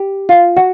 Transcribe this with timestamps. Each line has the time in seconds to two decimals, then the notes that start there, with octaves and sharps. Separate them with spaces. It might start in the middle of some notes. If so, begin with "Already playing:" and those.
Already playing: G4
0.29 F4
0.57 F#4